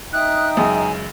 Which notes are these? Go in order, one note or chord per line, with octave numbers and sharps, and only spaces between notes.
D#4 E5 G5 D#6 F#6
C#2 F#2 C#3 G#5